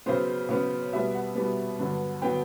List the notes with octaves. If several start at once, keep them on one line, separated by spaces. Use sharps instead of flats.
C#3 F#3 B3 C5
C#3 F#3 B3
B2 G3 B3 E5
F#5
B2 G3 B3
G2 D3 F#3 B3
D3 F#3 B3 G5